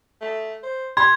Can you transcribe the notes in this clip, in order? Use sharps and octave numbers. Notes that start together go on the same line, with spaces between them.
A3
C5
G4 C6 G#6